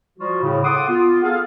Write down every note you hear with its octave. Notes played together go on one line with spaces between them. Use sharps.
F3 G3 F4 F#4
A2 C#3
A4 F#5 C6 D6 D#6
B3 F4
G#4 A4 F5